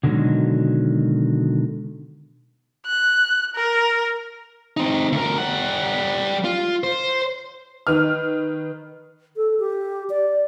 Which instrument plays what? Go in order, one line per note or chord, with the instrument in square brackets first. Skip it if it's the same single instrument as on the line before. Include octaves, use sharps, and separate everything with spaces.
[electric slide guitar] B2 D3 D#3 F#3 G#3
[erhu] F#6
A#4
[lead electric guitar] C4 D#4
D2 A#4
G3 F#5
F4
C5
[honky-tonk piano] D#3 B4 F6
[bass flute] A4
G4
D5